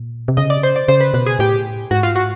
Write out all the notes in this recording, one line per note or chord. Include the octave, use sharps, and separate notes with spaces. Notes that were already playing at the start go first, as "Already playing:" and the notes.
Already playing: A#2
C3
C#3 D#5
D5
C5
D5
C#3 C5
B4
B2 B4
G#4
A2 G4
G#2 F#4
F4
F#4